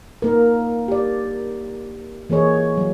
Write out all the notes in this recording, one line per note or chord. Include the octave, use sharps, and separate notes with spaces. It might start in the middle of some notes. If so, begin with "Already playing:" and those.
A#3 D#4 A#4
G4 D5
E3 A#3 G#4 C#5 D#5
F#3